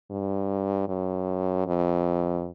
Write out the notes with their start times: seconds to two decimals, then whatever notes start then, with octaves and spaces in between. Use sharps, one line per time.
0.11 G2
0.88 F#2
1.66 F2